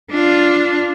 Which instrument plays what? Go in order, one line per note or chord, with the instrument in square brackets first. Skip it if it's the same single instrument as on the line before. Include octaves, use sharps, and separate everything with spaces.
[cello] D4 F4